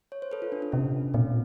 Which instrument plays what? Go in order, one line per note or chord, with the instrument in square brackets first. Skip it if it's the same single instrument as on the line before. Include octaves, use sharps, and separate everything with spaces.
[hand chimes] C#5
C5
A4 B4
F4
D4
D4
[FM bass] C3 [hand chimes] C#4
[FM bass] A#2 [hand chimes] C4